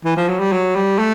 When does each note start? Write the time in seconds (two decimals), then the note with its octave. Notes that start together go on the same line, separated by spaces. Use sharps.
0.05 E3
0.16 F3
0.29 F#3
0.39 G3
0.52 F#3
0.75 G3
0.99 A3